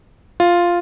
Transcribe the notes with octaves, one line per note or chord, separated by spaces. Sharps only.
F4